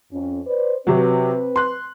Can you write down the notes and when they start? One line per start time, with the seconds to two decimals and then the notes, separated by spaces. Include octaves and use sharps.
0.13 F2 C#4
0.47 B4 C5 D5
0.87 C3 F#3 C4 B4
1.56 C6 F#6